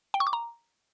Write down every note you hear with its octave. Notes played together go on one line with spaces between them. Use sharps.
G5
C#6
D6
A#5